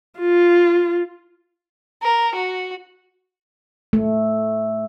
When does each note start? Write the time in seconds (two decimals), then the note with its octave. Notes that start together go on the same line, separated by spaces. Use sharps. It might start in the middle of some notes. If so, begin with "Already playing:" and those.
0.20 F4
2.03 A#4
2.35 F#4
3.93 A3